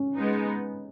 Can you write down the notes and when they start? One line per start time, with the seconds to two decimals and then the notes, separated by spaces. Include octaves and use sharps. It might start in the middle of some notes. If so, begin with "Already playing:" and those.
Already playing: C#4
0.15 G#3 B3 D#4